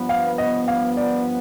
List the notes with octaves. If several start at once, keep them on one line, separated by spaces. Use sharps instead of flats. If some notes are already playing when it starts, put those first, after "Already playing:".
Already playing: G2 F3 B3
F5
D#5
F5
D5